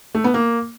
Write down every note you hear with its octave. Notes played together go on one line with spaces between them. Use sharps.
A3
B3
A#3